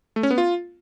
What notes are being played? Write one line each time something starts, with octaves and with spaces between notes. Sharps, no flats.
A3
C#4
B3
F4